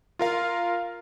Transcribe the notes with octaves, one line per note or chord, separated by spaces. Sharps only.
F4 A#4 F5